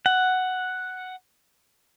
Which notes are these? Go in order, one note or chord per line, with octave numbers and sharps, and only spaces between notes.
F#5